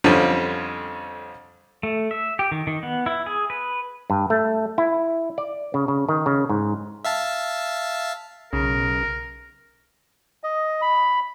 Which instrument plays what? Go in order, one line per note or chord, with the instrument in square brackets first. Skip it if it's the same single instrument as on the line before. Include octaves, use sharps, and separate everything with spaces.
[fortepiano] F2 D3 G3 C4 C#4 F4
[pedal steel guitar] A3
E5
G4
D#3
D#3
B3
E4
G#4
B4
[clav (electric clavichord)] G2
A3
E4
D5
C#3
C#3
D#3
C#3
G#2
[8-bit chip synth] E5 F5 A5
[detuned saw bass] B1 [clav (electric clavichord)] C#3 [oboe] A#4
[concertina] D#5
B5